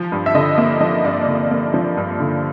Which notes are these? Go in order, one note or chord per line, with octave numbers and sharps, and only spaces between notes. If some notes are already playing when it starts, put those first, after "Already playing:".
Already playing: F3
G2
E5
D3 D#5
A#3 E5
F3 D#5
G2 D5
D3
A#3
F3
G2
D3